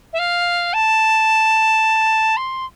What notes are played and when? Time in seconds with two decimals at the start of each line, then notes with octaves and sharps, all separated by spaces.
0.13 E5
0.18 F5
0.73 A5
2.36 C6